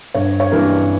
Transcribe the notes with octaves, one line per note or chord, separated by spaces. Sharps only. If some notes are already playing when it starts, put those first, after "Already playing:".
G1 C#5
C#5
G2 E3 G3 A#3 A#4